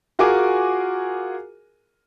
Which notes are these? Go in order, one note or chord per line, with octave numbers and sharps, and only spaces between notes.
F4 F#4 G#4 A#4 G#5 D6